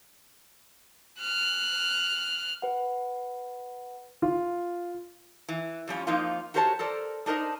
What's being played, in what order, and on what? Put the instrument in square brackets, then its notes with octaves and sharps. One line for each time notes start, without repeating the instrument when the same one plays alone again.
[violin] F6 F#6
[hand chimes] B4 F#5
[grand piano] F4
[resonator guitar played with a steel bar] E3
F2 G3 C#4 F4
F2 F3 A#3 D#4 F4
F#4 G4 A#4 C5 C#5 A5
A4 A#4 C5 D5
D4 D#4 A#4 C5 D#5